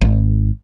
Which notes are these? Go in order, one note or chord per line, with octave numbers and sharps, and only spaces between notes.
G#1